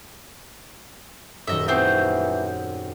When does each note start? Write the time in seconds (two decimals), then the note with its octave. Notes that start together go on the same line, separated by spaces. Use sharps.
1.47 D#1 F#2 D#5 E5
1.68 E3 C4 C5 F#5 C#6 D#6 G6